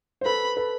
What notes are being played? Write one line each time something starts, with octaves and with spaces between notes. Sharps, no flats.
C5
A4 B4 B5
A4 B4